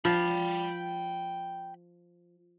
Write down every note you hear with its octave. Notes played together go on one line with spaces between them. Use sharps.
F3 G5 B5